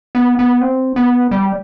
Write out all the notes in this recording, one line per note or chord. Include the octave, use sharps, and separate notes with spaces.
B3
B3
C4
B3
G3